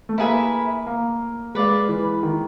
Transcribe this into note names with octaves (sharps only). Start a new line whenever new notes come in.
A3
A#3 E4 G#4 B4 E5
A#3
G#3 B4 D5 F5
E3
D#3